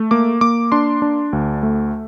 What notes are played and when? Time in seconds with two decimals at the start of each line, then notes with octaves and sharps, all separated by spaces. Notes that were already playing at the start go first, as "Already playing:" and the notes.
Already playing: A3
0.11 A#3 D6
0.41 A#3 D6
0.72 D4 C6
1.02 D4
1.33 D2
1.63 A3